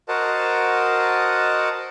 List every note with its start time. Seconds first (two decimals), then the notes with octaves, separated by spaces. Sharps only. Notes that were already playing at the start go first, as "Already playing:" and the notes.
0.08 F#4 A#4 C5 D#5 F#5 A5